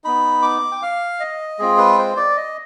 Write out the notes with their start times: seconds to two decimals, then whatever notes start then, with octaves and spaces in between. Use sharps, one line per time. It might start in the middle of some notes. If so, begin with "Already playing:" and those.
0.04 B3 D#4 B5
0.42 D6
0.72 G5
0.82 F5
1.20 D#5
1.59 G#3 C4 F4 G#4
1.78 B4
1.98 C5
2.17 D5
2.37 D#5